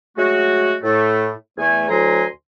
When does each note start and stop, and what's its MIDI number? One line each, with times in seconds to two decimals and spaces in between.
0.17 0.74 54
0.17 0.74 56
0.17 0.74 57
0.17 0.74 66
0.82 1.31 45
0.82 1.31 57
1.58 1.86 40
1.58 1.86 57
1.58 1.86 80
1.89 2.24 38
1.89 2.24 45
1.89 2.24 54
1.89 2.24 80
1.89 2.24 82
1.89 2.24 84